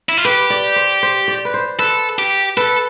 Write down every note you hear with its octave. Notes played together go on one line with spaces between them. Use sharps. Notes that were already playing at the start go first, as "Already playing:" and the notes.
E4
F4
G4 B4
D5
C5
C5
D5
B4
C5
A4 B4
G4
A4 B4